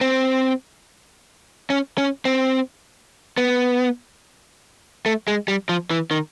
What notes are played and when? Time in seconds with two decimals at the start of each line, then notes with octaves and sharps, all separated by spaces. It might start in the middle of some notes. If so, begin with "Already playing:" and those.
0.01 C4
1.70 C#4
1.98 C#4
2.25 C4
3.37 B3
5.06 A3
5.28 G#3
5.48 G3
5.69 F3
5.91 E3
6.11 D#3